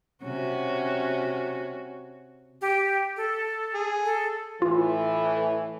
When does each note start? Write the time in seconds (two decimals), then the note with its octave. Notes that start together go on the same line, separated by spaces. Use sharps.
0.23 C3 C#4 F#4
2.61 G4
3.17 A4
3.74 G#4
4.05 A4
4.62 A2 E3 F4